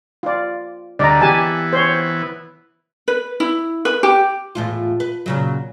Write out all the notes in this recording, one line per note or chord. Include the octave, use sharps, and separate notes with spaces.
F4 D5
D2 D3 G3 D5 D#5 A#5
E3 B3 G4 G#5 A5
C5 C#5
B4
E4
B4
G4
E2 A2 F4
B4
A#2 C#3 F#3